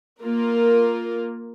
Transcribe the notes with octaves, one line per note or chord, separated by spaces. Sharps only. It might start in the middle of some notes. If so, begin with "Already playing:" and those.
A#3 F4 A#4